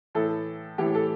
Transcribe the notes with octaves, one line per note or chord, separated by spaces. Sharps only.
A2 E3 A4
A2 E3 G4
A4